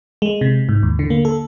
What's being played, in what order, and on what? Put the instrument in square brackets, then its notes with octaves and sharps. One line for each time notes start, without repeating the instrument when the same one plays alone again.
[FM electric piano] G#3
C3
G#2
D#2
D3
A#3
A4